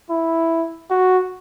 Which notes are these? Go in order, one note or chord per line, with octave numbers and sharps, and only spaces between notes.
E4
F#4